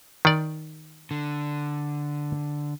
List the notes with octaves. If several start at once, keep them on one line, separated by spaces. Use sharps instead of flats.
D#3 D5
D3